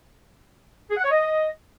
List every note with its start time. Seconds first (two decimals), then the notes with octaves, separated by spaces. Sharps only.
0.90 G#4
0.97 F#5
1.04 C#5
1.11 D#5